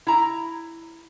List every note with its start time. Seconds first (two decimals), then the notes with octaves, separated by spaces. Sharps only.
0.07 E4 A#5